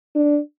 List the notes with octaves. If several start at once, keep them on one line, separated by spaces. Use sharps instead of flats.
D4